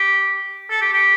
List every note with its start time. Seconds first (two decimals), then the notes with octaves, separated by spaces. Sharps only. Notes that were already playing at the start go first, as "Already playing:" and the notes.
Already playing: G4
0.70 A4
0.81 G4
0.93 G4